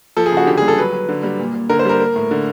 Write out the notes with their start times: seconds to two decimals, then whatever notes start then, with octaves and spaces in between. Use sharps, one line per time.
0.17 F3 A4
0.26 G#4
0.32 C#3
0.37 F#4
0.47 D3 G4
0.57 G#4
0.62 G3
0.68 A4
0.77 F#3 B4
0.93 F#3
1.09 D3
1.23 G3
1.39 A#2
1.55 A#2
1.69 D3 A#4
1.79 C5
1.85 G3 A#4
2.00 A#3
2.16 A2
2.31 D3